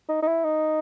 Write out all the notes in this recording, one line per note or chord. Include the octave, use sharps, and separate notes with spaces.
D#4
D#4
E4
D#4